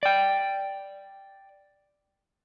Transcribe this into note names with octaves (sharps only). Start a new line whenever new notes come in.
D5 G5